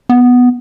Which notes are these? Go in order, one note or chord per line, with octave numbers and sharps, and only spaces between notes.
B3